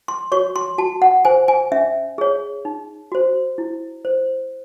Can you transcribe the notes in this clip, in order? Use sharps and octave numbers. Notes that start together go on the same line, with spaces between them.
C6
F#4 C#5 C#6
C6
F#4 A5
F#5
C5 G#5
G#5
C#4 E5
G#4 C#5
D#4
F#4 C5
E4
C5